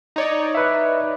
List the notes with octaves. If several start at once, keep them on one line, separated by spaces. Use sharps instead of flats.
D#4 C#5 D5
B4 E5